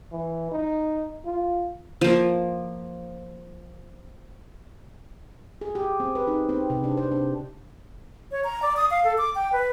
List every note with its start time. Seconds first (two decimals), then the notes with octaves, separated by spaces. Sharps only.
0.11 E3
0.51 D#4
1.25 F4
2.01 F3 A#3
5.61 G#4
5.75 G4
6.00 C4
6.15 B4
6.27 D#4
6.49 C4
6.70 C3
6.84 D4
6.97 C5
7.12 D4
8.31 C#5
8.44 A#5
8.62 D5
8.77 D#6
8.91 F5
9.04 A4
9.18 D6
9.35 G5
9.53 B4